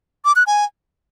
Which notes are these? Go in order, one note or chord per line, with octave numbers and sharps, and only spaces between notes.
D6
F#6
G#5